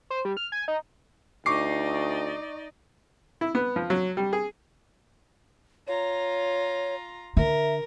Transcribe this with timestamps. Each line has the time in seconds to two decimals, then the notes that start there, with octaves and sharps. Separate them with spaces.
0.10 C5
0.25 G3
0.37 F6
0.52 G#5
0.68 D#4
1.46 D2 D#4 D5 D#5 C#6 D6 C7
3.41 E4
3.55 B3
3.76 F3
3.90 F#3
4.17 G3
4.33 G#4
5.88 F4 C#5 A#5
7.37 D3 A#4 E5